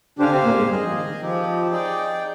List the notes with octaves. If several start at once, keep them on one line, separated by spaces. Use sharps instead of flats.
D3 D4 G4 C5 F5 G#5
C3 C4
A#2 A#3
G#2 G#3
G2 G3 G#4 D#5 G#5
F3
D#3
D#3
F3 C4 D#4 G4
D#4 G#4 D5 G5